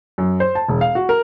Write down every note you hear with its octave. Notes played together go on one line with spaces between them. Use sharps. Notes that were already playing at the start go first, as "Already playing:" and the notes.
F#2
C5
A5
E1
F5
F#4
A#4